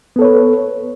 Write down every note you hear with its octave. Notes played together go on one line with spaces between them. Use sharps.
B3 A4 B4 C#5